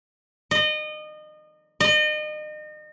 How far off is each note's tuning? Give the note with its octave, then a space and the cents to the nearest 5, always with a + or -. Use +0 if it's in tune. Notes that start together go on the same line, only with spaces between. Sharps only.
D#5 -30
D#5 -35